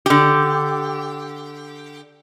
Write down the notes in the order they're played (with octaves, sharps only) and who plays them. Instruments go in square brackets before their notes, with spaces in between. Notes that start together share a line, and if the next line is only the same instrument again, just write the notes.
[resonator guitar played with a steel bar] D3 G4